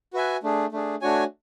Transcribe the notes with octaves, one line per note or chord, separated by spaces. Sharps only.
F#4 B4 E5 G#5
A3 D4 G#4
A3 D4 G#4
A3 D4 F#4 C#5 G#5